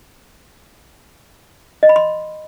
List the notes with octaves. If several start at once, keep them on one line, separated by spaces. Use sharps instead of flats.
D#5
B5
C6